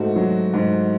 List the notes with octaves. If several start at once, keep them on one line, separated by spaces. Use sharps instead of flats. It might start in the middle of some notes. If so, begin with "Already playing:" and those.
Already playing: G#2 A3 F#4
F#3
G#2